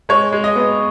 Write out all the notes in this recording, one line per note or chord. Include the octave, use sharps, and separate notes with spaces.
G#3 C#5
G#3
D#5
B3